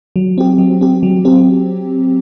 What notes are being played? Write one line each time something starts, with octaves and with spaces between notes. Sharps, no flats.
F#3
C4 G4
F#3
C4 G4
F#3
C4 G4